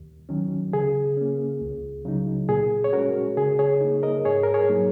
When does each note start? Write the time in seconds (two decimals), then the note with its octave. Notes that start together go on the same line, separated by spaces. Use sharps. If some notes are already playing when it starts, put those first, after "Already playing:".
Already playing: D#2
0.29 D#3 F#3 C#4
0.73 C#3 G#4
1.17 A#3 C#4
1.61 C#2
2.05 C#3 F#3 D#4
2.49 A#2 G#4
2.84 C#5
2.93 G#3 C#4 F#4 A#4
3.37 C#3 G#4
3.59 G#4 C#5
3.81 A#3 D#4
4.03 A#4 D#5
4.25 G#2 G#4 C#5
4.43 A#4
4.54 G#4 C#5
4.69 F#3 A#3 D#4